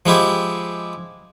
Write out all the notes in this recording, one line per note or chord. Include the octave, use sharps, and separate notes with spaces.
F3 G#3 E4 G4